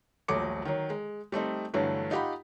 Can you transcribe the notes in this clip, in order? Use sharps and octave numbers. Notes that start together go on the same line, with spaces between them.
D#1 A#1 F#3 A3 D6 C#7
D#3 F#3
G#3
G3 A3 C4 D#4
G2 D3 E3 F#3 A3
D#4 F4 G4 F#5 B5